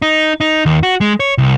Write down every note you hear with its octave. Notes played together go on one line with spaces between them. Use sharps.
D#4
D#4
D#2
F#4
G#3
C#5
C2